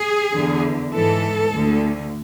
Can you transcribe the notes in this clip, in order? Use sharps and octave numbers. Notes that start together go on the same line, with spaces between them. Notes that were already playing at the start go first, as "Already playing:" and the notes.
Already playing: G#4
E2 D3
G#2 E3 A4
D2 D3